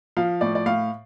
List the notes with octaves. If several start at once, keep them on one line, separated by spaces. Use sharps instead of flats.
F3 F5
A2 D5
D5
A2 F5